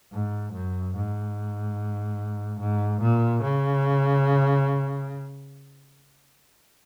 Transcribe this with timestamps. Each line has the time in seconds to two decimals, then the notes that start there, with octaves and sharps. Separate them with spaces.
0.12 G#2
0.53 F#2
0.95 G#2
2.60 G#2
3.01 A#2
3.43 C#3